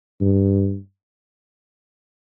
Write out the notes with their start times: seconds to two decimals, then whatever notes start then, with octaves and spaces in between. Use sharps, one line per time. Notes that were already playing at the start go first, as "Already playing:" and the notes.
0.21 G2